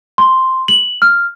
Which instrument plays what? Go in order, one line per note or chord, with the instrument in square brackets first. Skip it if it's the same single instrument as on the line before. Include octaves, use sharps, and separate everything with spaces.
[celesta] C6
F#7
F6